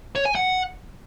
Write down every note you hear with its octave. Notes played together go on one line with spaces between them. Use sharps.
C#5
G#5
F#5